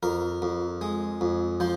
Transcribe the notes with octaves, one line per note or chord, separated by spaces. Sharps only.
F2 A#4
F2
G#3
F2
F3 C5